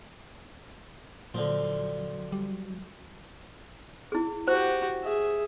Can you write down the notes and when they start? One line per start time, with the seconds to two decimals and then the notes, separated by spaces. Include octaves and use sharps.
1.34 A#2 D3 F3 F#3 C4
2.32 G3
4.12 E4 G#4
4.48 F#4 G4 C5
5.03 G#4 E5